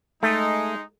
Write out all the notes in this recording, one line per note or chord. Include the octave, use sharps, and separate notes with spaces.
G#3 A3 D#4